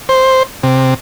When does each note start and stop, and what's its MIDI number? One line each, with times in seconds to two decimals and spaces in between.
0.09 0.43 72
0.63 0.94 48